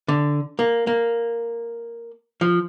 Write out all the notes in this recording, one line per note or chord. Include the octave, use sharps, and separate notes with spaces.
D3
A#3
A#3
F3